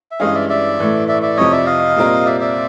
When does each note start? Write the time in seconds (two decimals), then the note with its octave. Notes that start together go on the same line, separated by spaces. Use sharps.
0.11 E5
0.20 G2 E3 G#3 C#4 D#5 F5
0.35 D5 E5
0.49 D5 E5
0.79 A2 E3 A3
1.08 D5 E5
1.22 D5 E5
1.37 F2 C3 F3 C#5 D#5
1.52 D5 E5
1.66 D#5 F5
1.96 A#2 G3 C4 F4 A#4
2.26 D5 E5
2.40 D5 E5